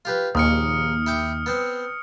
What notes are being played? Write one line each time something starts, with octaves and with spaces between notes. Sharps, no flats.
F4 G4 B4
A#1 D#2 G#5 C#6 D#6 F6 C#7
E4 G5 D6
B3 C4